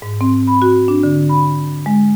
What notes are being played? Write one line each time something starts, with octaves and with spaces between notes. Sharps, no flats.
G#2
C4
B5
F#4
D4
D3
B5
G#3